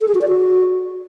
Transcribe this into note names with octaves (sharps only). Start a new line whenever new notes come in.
A4
G#4
F#4
D5
F#4